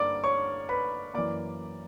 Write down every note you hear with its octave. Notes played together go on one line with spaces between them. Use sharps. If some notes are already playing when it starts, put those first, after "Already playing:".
Already playing: G2 D3 A#3 D5 D6
C#5 C#6
B4 B5
F#2 E3 A#3 D5 D6